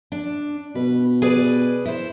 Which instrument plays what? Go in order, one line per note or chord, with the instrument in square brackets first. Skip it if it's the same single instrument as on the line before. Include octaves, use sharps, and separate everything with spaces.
[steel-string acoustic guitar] D4
[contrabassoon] B2 [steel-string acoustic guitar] B4
[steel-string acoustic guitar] G#4 B4 D5
E4 C5